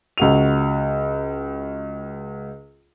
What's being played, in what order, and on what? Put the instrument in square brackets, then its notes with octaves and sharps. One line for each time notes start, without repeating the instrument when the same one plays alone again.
[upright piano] C#2 F#4 F7